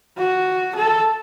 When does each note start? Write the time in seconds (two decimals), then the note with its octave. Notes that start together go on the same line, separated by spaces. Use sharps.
0.18 F#4
0.76 A4